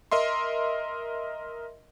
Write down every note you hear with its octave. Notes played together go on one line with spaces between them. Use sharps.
A#4 D#5 E5 C6